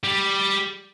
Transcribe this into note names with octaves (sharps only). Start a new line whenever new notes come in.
G3